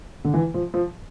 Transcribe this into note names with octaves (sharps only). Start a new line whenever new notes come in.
D3
E3
F3
F3